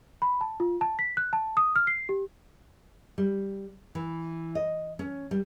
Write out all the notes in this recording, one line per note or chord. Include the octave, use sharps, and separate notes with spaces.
B5
A5
F4
A5
B6
F#6
A5
D#6
F6
C7
G4
G3
E3
D#5
C#4
G3